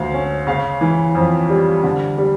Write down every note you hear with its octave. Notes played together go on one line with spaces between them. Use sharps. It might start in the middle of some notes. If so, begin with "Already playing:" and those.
Already playing: D2 F5
C#4
C#3 F5
E3
F2
G3
D3
G3